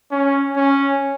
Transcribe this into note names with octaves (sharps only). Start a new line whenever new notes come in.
C#4
C#4